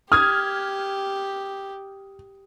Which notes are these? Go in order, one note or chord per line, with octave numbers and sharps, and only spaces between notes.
G4 D#6 F6 G#6